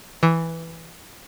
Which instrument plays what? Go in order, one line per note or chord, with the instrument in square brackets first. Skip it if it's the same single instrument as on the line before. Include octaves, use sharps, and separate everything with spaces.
[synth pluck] E3